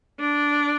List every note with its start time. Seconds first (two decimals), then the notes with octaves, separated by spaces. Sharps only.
0.19 D4